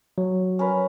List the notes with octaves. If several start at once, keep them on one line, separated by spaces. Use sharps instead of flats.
F#3
C#4 A#4 B4